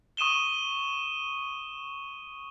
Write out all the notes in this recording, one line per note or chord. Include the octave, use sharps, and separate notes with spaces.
C#6 D#6 D#7 E7 G7